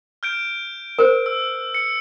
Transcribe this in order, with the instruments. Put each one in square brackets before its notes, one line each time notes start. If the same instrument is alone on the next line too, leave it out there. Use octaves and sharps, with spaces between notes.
[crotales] F6 G6 D7
[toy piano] A#4 C5
[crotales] E6
C#7